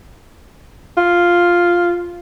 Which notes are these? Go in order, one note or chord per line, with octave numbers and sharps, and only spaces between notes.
F4